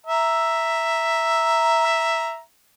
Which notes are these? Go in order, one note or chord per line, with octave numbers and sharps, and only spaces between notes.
E5 A#5